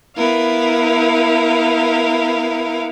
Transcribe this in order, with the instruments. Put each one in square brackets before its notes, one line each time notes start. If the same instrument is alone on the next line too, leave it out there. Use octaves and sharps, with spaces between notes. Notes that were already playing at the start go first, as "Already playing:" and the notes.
[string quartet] B3 E4 A#4 F5